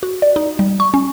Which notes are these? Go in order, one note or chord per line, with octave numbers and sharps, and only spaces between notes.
F#4
D5
D#4
G3
C#6
C#4